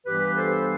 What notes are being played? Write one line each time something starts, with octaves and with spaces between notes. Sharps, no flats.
G2 E3 G3 B3 G4 B4
A4 C5